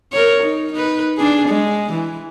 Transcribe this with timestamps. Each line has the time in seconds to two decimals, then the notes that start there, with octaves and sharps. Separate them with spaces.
0.12 A#4 C#5
0.43 D#4
0.72 D#4 B4
1.17 D4 G#4
1.49 G#3
1.92 E3